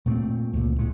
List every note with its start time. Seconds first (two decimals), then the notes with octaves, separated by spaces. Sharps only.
0.06 A#2 A3 B3 C4
0.53 C#2 A#2
0.79 D1 A2 G#3 A3